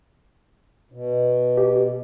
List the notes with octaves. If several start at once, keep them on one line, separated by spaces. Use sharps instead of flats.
B2
G4